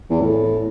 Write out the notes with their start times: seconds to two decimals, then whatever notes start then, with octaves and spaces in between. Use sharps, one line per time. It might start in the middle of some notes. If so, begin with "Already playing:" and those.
0.10 E2
0.21 A2